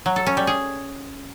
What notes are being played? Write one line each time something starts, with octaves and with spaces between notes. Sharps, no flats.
F#3
A4
C#4
G3
G#4